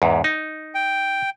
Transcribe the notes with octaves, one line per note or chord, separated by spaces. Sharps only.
E2 G#2
D#4
G5